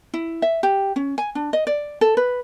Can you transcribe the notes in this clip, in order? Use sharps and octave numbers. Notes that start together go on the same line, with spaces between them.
E4
E5
G4
C#4
G#5
D4
D#5
D5
A4
B4